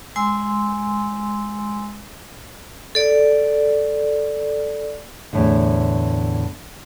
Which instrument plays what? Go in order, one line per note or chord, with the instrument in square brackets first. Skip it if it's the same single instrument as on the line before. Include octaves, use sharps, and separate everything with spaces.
[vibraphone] G#3 G#5 C6 E6
A4 D5
[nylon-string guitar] E2 A2 D3